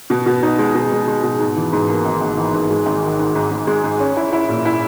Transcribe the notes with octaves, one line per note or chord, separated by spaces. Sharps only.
B2
B2
D#4
G#3
B2
G#3
G#3
B2
G#2
E3
G#2
A#3
G#1
G#1
E3
G#2
G#3
G#1
D#3
G#2
G#2
G#2
G#3
G#2
C#4
E4
E4
A#2
E4